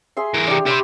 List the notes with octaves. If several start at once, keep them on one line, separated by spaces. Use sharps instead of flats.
G#4 E5 C6
E3 A#4
D4 G4
G4 E5 G5 B5 C6